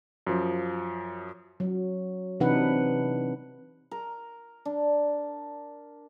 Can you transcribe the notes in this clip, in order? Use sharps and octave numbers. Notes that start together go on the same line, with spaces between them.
F#2 F3
F#3
C3 E3 D4 D#4 B4 F#5
A#4
D4